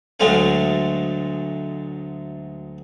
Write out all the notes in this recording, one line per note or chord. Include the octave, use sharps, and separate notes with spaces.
D2 F#3 G#3 A3 F5